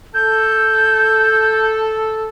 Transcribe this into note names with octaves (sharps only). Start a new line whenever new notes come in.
A4 G6